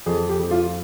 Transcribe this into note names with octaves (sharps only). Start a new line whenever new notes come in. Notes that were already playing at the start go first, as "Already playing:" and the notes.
F2 G#4
G4
F2
F4